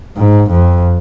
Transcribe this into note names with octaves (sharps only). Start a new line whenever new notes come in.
G#2
F2